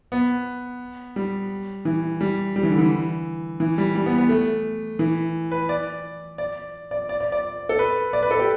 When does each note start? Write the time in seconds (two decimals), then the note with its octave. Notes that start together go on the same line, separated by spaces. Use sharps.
0.12 B3
1.16 G3
1.85 E3
2.21 G3
2.56 G3
2.63 E3
2.71 D3
2.79 E3
3.60 E3
3.78 G3
3.95 G3
4.06 B3
4.18 B3
4.29 A3
4.99 E3
5.52 B4
5.69 D5
6.38 D5
6.91 D5
7.09 D5
7.21 D5
7.32 D5
7.69 A4
7.79 B4
8.13 D5
8.23 B4
8.31 A4
8.39 G4